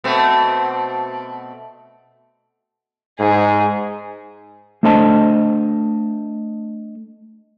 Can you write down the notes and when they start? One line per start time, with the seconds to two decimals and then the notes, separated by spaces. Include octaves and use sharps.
0.04 B2 A3 C4
3.20 G#2 G#4
4.83 A3 D4 A4 C5 D#5 A5